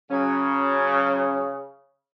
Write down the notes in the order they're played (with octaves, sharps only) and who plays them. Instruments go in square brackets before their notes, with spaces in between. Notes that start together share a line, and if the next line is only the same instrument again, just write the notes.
[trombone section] C#3 [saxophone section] F#3 C#4